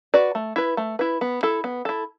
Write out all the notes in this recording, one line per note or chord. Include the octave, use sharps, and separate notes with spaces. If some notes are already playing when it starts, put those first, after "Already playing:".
F#4 B4 D5
A3
E4 B4
A3
E4 B4
B3
E4 A4
B3
E4 A4